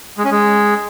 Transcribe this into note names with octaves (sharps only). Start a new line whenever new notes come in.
G#3
C#4
G#3